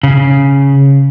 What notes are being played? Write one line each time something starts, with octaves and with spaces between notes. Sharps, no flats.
C#3